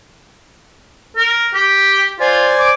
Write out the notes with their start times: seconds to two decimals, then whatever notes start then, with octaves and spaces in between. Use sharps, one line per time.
1.17 A#4
1.54 G4
2.20 F4 C5 D5 G#5
2.60 D6